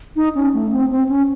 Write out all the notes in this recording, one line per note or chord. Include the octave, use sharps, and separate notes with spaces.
D#4
C#4
A3
C4
C4
C#4